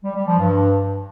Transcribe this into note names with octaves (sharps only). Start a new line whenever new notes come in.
G3
G3
F3
G2